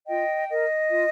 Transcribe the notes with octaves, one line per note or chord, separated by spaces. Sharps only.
F4 D#5 G5
A#4 D#5
F4